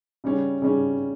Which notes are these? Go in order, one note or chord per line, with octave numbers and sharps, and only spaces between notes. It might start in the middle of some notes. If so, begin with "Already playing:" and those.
C#3 G3 C#4
C#3 G3 C#4